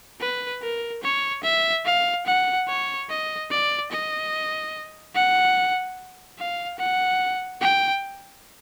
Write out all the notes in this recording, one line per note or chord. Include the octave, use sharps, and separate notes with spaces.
B4
A#4
C#5
E5
F5
F#5
C#5
D#5
D5
D#5
F#5
F5
F#5
G5